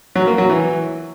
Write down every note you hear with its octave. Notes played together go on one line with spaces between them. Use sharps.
F#3
A#3
F#3
E3